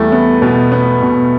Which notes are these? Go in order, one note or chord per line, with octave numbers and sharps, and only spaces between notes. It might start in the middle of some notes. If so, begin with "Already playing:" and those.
Already playing: E2 G3 A3
B3
B2
B3
B2